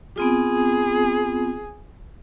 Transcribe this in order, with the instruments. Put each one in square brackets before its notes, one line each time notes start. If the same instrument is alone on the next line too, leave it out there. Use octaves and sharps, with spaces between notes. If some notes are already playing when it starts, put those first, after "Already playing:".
[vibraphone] B3 C4 F4 [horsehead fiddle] G#4